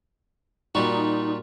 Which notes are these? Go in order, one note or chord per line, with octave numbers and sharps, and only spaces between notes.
A#2 G3 D#4 F#4